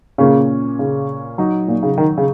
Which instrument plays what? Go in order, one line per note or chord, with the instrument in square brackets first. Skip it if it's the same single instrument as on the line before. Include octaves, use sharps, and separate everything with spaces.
[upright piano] A#2 A#3 C#4 [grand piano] C#3
[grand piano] C#3
[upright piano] F#3 D#4
[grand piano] A#2
C#3
D#3
C#3